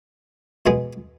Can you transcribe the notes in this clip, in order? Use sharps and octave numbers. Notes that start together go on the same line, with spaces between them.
B2 G#3 B3 G#4